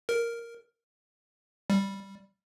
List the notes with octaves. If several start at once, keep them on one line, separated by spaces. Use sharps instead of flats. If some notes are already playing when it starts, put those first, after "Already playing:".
A#4
G3